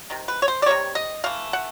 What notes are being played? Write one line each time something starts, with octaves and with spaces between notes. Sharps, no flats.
C3 D#3
B4
C#5
C5
D5
C3 D#3 G3 C#5
D#5
E3 A3 F5
F#5